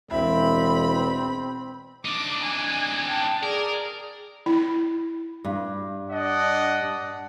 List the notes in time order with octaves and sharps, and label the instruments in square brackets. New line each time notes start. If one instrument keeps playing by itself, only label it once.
[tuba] E1 [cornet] C4 [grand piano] E4 [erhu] B5
[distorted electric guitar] D4 D#4 [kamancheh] D6
[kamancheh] G#5
G5 A5
[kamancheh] G#4 D5 [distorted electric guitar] A#4
[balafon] E4
[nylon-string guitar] G2
[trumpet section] D4 D#5 F#5